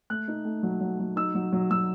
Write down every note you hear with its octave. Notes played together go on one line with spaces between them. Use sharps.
A3 F#6
D#4
A3
F#3
F#3
F#3
D#4 E6
F#3
F#3
F#3 E6